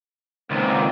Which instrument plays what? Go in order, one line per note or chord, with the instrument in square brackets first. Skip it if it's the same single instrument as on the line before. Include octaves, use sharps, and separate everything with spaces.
[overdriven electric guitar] C#2 A#2 [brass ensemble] D#3 B3 C4